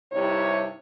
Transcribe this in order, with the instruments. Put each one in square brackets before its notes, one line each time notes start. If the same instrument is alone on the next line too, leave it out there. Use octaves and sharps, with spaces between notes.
[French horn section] G2 C3 G3 D#4 E4 C#5